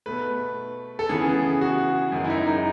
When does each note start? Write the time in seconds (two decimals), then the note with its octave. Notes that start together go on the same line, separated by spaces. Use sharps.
0.06 B2 A3 B4
0.99 A4
1.09 C#3 E3 B3 G#4
1.61 F#4
2.12 F#2 D#3 G#3
2.24 E4
2.30 D#4
2.47 D#4